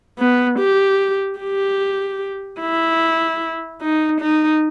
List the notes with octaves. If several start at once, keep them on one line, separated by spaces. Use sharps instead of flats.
B3
G4
G4
E4
D#4
D#4